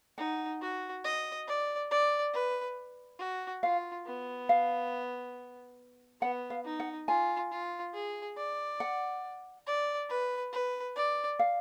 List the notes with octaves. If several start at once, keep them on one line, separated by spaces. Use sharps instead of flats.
D#4 F#5
F#4
D#5
D5
D5
B4
F#4
F4 F5
B3
F5
B3 F#5
F5
D#4
F#5
F4 G#5
F4
G#4
D5
F#5
D5
B4
B4
D5
F5